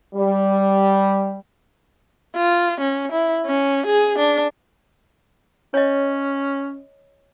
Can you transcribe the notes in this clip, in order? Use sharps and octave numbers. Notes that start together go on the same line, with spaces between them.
G3
F4
C#4
E4
C#4
G#4
D4
C#4 C#5 D#5